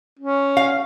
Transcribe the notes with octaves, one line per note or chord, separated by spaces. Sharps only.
C#4
F5